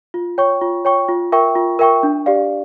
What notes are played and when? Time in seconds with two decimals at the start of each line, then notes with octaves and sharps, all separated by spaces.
0.14 F4
0.38 C#5 G5 C#6
0.61 F4
0.85 C#5 G5 C#6
1.08 F4
1.32 A#4 E5 G5 C#6
1.55 F4
1.79 A#4 E5 G5 C#6
2.03 D4
2.26 G4 D5 F5